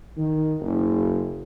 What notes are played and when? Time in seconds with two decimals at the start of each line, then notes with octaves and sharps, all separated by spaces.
0.17 D#3
0.60 F#1